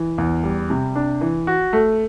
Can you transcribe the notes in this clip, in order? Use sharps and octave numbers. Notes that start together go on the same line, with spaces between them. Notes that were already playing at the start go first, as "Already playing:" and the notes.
Already playing: E3
E2
G3
C3
D4
E3
F#4
A3